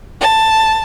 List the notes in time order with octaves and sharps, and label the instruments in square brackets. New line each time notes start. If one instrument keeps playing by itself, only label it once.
[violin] A5